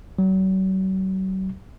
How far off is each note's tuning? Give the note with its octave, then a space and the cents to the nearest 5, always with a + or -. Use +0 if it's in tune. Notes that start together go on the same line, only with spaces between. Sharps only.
F#3 +40